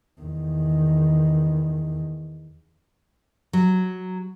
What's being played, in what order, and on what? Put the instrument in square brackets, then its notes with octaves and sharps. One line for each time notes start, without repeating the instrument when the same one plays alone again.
[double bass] E2 D#3
[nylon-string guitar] F#3